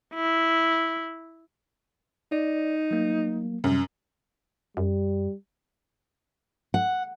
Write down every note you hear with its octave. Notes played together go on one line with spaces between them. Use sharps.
E4
D#4 D5
F#3 A#3
F#2 C3 G3
F#2 G3
F#5